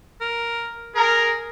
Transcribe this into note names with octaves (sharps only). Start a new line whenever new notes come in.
A#4
G#4 A#4